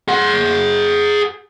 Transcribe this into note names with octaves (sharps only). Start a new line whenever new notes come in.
G#4 F#5